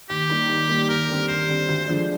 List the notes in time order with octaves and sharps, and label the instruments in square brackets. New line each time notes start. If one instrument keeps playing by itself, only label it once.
[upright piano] D#2 [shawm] G4
[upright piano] D#3 G3 A#3
D#2
D#3 G3 A#3
[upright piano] D#2 [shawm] A#4
[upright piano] D3 G3 C4
[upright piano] D#2 [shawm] C5
[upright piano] D3 G3 C4
D2
D3 F3 G#3 D4